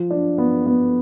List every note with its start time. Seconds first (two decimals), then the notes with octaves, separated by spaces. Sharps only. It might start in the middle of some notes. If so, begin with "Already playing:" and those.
Already playing: F3
0.11 D4
0.38 B3
0.66 B3